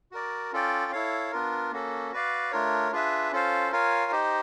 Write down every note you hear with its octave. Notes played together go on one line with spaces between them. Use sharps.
F#4 A#4 D5
C#4 F4 A4 D5 G5
E4 A4 C#5 F5
B3 D4 F4 A#4
A#3 C#4 F#4 A4
F#4 B4 D5 F5
A3 D4 F4 A#4 C#5
D4 F4 G#4 B4 E5
C#4 F4 A4 C5 F5
F4 A#4 C#5 F5 G#5
D#4 G4 C5 D#5